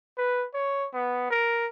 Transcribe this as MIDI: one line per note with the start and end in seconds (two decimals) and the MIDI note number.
0.18 0.46 71
0.54 0.87 73
0.93 1.30 59
1.30 1.68 70